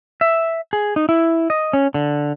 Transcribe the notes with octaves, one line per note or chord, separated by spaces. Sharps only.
E5
G#4
D#4
E4
D#5
C#4
D3